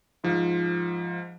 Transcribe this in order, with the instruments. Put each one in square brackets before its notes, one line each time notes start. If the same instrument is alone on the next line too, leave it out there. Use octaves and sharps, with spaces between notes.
[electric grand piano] G#2 F3